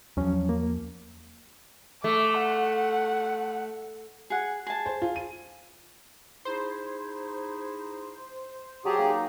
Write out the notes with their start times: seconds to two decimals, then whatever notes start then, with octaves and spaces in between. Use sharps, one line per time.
0.17 E2 F3 F#3 C#4
0.49 A#3
2.04 A3 D6
2.40 F#5
4.30 G#4 F#5
4.67 G#4 A5
4.86 C5
5.02 F4
5.16 D#7
6.45 D#4 E4 G#4 C5
8.85 F#3 G4 G#4 E5 A5 D#6
8.98 A#3 D#4